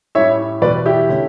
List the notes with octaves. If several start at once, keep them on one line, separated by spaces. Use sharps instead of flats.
A2 G3 C#4 E4 C#5 E5
E2 B2 G3 B4 D5
E4 G4
D3 A3 C#4